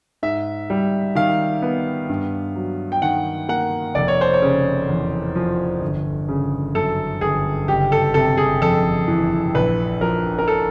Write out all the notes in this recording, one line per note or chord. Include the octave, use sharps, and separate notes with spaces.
G#2 E5
G3
D#3 F5
B3
G2
F#3
G5
D#3 F#5
A#3 F#5
F1 D5
C#5
C5
C#5
C#3
E2
F3
G1
C#3
F#2 A4
G1 G#4
F#1 G4
A4
C3 A4
G#4
F2 A4
E3
A#1 B4
F3 A#4
A#4
A4